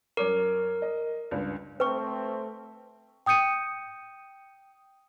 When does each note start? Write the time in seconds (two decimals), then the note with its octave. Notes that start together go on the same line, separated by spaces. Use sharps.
0.17 F#2 A#4 C#5 D6
0.82 D#5
1.31 C#2 G2 B4
1.80 A3 C4 B4 G5 C#6
3.26 G5 D#6 G6 C#7 D#7